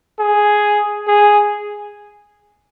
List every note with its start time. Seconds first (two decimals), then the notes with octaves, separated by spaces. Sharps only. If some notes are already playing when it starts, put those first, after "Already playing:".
0.20 G#4
1.08 G#4